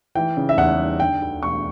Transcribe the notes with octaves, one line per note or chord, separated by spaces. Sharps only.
E3 G5
C#3
E5
E2 F#5
G3
D3 G5
D2
E1 C#6